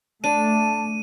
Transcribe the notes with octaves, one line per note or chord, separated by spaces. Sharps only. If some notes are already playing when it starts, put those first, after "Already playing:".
A3 D4 A5 D#7